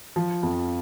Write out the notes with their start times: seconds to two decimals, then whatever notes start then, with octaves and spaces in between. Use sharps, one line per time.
0.16 F3
0.43 F2